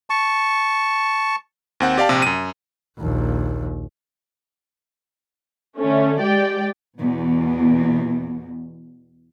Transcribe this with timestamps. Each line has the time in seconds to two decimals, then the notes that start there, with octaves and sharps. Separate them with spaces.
0.10 A5 C#6
1.80 D#2 C4 F#5
1.98 G4 D5 F5 A5
2.09 A#1 C3
2.22 F#2 D#7
2.98 A#1 D#2
5.77 D3 A3 C#4
6.21 G#3 G4 D5 G5
6.98 E2 B2